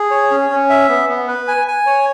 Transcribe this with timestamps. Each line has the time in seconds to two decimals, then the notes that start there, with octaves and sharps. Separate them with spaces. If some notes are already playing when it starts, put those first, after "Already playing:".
Already playing: G#4
0.11 C#5
0.31 C#4
0.50 C#4
0.69 E5
0.88 B3
1.09 B3
1.28 B4
1.48 G#5
1.68 G#5
1.86 C#5